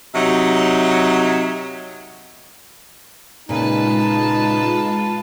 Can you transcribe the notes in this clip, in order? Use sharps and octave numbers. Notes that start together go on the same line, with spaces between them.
C3 F#3 D#4 E5
A#2 C#3 G#3 D#4 F4 B4 A5